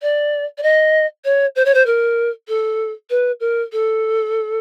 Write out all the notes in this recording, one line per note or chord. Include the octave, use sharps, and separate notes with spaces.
D5
D5
D#5
C#5
C5
C#5
C5
A#4
A4
B4
A#4
A4